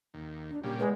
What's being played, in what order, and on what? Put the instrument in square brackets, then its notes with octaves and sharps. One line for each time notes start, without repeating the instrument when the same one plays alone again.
[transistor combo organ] D#2
[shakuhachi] D4
[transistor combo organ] A#2 C#3 G3 [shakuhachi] G4
[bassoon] E2 [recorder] G#3 [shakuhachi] B4